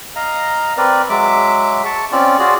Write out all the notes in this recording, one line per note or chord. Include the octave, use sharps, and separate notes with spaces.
D#5 F5 A#5
C4 A#4 B4 D5
F#3 G#3 E5 D6
A5 C#6
C4 C#4 F4 D5
F4 F#4 G#4 D5